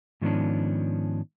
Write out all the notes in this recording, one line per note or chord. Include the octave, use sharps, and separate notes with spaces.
G#2 D#3 F3 B3 C#4 D4